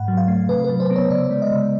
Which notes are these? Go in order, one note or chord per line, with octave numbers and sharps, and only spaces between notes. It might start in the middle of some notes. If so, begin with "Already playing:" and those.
Already playing: G#2 F#5
F#3
F5
A3
C3 B4
B4
F#3
C5
B3
C#5
C#3 D5
G#3
D#5
C#3